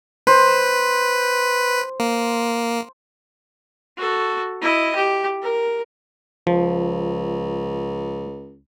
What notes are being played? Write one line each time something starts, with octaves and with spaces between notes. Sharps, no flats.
B4 C5
A#3
F#4 A4
E4 D#5
G4
A#4
C#2 F3